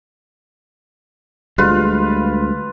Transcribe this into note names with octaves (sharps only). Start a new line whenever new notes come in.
D2 G3 G#3 F4 B4